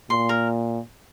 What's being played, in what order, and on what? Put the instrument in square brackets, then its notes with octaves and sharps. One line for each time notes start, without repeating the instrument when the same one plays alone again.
[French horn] A#2 [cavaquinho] C6
[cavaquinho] A#4